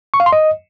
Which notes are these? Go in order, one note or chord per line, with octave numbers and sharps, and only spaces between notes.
C#6
F5
C6
D#5